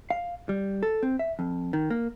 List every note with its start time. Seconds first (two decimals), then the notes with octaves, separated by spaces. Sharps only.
0.10 F5
0.49 G3
0.83 A4
1.03 C4
1.19 E5
1.39 F2
1.73 D#3
1.90 A#3